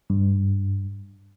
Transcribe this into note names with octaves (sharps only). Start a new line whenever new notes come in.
G2